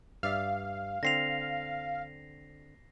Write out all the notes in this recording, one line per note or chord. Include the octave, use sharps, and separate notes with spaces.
G2 D5 E5 F5
D3 C4 A#6 C7 F7